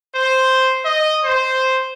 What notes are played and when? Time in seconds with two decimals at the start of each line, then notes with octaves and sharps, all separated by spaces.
0.15 C5
0.85 D#5
1.25 C5